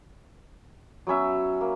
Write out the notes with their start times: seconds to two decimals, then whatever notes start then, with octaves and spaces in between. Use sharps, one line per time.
1.07 F#3 B3 C#4 E5
1.61 A#3